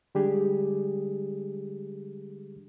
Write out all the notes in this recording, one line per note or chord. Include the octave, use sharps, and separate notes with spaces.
D3 G3 G#3 D4 G4 G#4